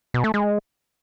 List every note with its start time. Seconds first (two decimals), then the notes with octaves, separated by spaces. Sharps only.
0.14 B2
0.24 A3
0.34 G#3